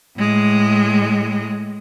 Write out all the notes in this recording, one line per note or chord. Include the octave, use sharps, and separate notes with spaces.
A2 G#3